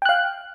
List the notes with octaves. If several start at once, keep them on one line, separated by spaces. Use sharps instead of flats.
F5 G5 F#6